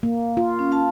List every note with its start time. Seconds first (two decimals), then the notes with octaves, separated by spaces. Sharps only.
0.03 A#3
0.37 F4
0.59 C#4
0.72 F5 A5